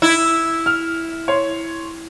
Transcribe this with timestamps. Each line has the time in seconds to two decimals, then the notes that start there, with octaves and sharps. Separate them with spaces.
0.02 E4
0.66 F6
1.28 C#5 C6